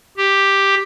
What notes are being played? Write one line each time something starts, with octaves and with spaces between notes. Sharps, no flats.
G4